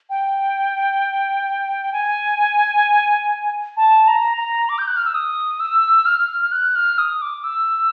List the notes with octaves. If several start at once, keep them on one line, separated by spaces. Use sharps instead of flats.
G5
G#5
A5
A#5
A#5
D6
G6
F#6
F6
E6
D#6
E6
F6
F6
F#6
F6
D#6
D6
E6